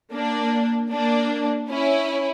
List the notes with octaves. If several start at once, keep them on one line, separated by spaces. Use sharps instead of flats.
A#3 D4
A#3 D4
C#4 E4